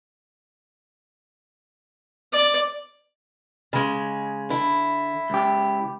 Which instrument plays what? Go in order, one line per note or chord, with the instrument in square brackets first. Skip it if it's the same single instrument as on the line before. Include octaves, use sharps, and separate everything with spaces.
[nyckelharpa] D5
[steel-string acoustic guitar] C#3 G#3
[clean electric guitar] D3 [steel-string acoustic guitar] E4
[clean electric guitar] C#2 G4